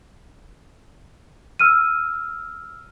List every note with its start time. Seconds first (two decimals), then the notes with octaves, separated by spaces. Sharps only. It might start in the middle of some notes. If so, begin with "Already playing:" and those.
1.59 E6 F6 D#7